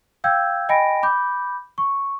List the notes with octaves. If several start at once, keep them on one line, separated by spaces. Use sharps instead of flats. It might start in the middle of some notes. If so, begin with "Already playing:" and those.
F5 G5 E6 G6 G#6
D#5 G5 G#5 B5 A#6 D7
B5 D6 G6
C#6